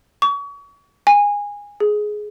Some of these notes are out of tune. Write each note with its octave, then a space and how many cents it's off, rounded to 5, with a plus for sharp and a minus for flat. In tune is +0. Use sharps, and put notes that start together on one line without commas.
C#6 +35
G#5 -20
G#4 +15